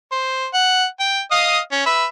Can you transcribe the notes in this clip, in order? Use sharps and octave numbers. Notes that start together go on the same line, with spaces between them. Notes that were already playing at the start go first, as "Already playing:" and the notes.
C5
F#5
G5
D#5 F5 D#6
C#4
B4 E5